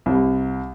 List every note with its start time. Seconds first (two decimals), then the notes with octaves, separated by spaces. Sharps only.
0.06 C2